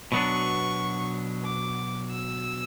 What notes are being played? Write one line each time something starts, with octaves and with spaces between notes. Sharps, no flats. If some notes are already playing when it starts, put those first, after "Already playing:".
B2 F#3 B3 D4 C#6
D6
E6